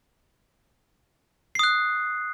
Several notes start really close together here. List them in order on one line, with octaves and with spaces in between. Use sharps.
C7 D#6 F#6